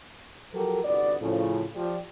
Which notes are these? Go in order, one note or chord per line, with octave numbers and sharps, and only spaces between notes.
F3 F#3 F#4 G4 A4 A#4
G1 C2 B3 F#4 D5
A2 C#3 F3
F3 G4 D5